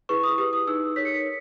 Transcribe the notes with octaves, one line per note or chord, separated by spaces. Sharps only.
E4 G#4 B4 C#6
D#6
G4 B4 D#6
D#6
D#4 G#4 B4 E6
D#4 A#4 C#5 B6
C#7
B6